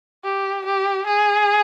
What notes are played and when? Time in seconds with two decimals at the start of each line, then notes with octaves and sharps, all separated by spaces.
0.24 G4
0.65 G4
1.07 G#4